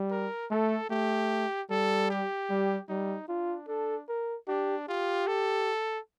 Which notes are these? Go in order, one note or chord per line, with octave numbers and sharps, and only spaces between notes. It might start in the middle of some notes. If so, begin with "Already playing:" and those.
Already playing: G3
A#4
A3 A4
A3 G4
G3 A4
G4
G3
G3 D#4
D4 F4
D4 A4
A#4
D4 G4
F4 G4
A4